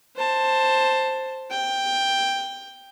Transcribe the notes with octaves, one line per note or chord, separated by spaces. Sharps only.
C5 A5
G5